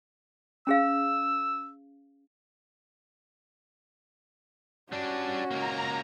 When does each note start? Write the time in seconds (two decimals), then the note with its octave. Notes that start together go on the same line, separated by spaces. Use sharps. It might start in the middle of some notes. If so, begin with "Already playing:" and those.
0.67 C#4 G#4 F5 E6
4.92 G3 C#4 D4 F#4
5.51 C#2 A#3 A#5